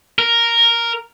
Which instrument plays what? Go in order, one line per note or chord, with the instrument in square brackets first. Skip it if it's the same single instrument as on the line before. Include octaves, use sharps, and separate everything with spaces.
[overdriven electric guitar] A#4